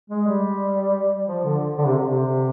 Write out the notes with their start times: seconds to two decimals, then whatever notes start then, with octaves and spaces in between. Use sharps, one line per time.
0.10 G#3
0.27 G3
1.28 F3
1.44 D3
1.78 D3
1.86 C3
2.03 C3